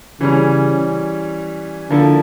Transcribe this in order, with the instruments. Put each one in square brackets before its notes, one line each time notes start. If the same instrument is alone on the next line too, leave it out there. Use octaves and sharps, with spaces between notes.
[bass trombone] C#3 [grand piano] E3 G3 C#4
[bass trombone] D3 [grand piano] F3 A#3 E4 A4